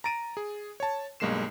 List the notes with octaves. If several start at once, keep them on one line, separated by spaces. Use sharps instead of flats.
A#5 A6 D7 D#7
G#4
C#5 A5
B1 G2 G#3 A#3 C7 E7